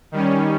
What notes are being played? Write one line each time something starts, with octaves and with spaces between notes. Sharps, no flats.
D#3 G3 C#4